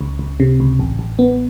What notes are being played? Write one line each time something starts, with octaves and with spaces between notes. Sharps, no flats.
C#2
C#2
C3
C#2
A1
A1
B3